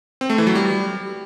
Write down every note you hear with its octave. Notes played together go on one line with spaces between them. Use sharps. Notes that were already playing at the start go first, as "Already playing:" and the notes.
C4
A3
E3
F#3
G3